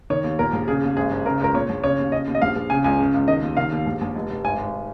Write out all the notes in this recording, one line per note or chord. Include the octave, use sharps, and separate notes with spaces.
D#3 C#5
D#2
A#2 A#4
A#1
C#3 G#4
D#2
G#1 G#4
G#1
C#3 A#4
C#2 A#4
A#2 C#5
A#1
C#3 C#5
D#2
C#3 D#5
D#2
D#5
A#1 F5
A#1
C#3 G#5
C#2 G#5
C#3
C#2
D#3 D#5
D#2
D#3 F5
D#2
A#1
A#1
F1
F1
G#1 G#5
G#1